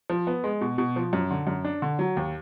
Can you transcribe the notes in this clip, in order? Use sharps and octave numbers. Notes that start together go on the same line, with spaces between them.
F3
B3
G#3
B2
B2
F3
F#2
D3
F#2
D4
D3
F#3
D#2